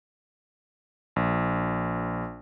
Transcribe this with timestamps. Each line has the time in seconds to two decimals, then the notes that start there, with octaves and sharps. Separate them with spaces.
1.16 A#1